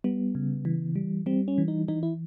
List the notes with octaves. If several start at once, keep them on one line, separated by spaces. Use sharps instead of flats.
G3 B3
C#3
E3
G3
G3 C4
C#4
E3
D#4
E3 D#4
E4